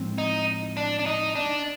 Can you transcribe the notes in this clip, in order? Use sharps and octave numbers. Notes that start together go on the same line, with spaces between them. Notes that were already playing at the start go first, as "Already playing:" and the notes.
Already playing: A2 F3 G#3 C4
D#4
D4
D4
D#4
D4